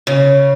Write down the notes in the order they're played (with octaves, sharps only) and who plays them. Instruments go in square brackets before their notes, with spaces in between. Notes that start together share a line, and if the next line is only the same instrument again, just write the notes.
[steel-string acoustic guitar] C#3